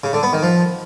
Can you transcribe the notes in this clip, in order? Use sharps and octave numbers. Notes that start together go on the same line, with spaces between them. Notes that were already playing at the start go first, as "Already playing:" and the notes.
C#3
D3
B3
D#3
F3